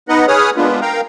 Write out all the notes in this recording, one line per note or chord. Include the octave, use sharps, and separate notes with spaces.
B3 D#4 B4 D#5 F#5
G#4 B4 C#5 D#6 F6
G#3 A#3 B3 D4 F4 B4
A#4 F5 G5 A#5